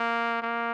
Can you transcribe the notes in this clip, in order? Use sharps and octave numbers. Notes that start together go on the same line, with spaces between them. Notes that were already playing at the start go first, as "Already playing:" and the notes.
Already playing: A#3
A#3